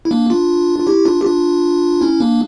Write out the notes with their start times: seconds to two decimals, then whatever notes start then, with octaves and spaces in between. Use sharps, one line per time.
0.05 E4
0.11 A#3 D4
0.30 D4 F4
0.79 F4
0.87 E4 G4
1.05 D4 F4
1.21 G4
1.25 D4 F4
2.01 C#4 E4
2.20 A#3 D4